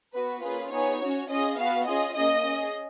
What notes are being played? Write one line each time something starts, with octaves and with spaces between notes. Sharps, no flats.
B3 F#4 B4
A#3 C#4 F4 G#4 B4
B3 D#4 G#4 C#5
C#4 F#4
C#4 F4 G#4 D#5
B3 F#4 F5
C#4 F4 G#4 D#5
A#3 C#4 G#4 D#5
C#4 G#4